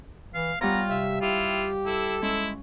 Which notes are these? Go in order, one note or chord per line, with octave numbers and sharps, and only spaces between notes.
E3 F5
G3 B3 F4 C#5 A#5
C3 E5 F5
E4 F4 G4
E4 A4
G#3 C#4 E4